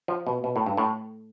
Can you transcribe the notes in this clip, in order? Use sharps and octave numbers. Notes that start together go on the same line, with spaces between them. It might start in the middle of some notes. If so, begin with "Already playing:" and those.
F3
B2
B2
A2
G2
A2